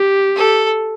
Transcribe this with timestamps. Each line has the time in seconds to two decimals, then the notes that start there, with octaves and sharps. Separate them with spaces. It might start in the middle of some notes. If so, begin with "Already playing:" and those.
Already playing: G4
0.37 A4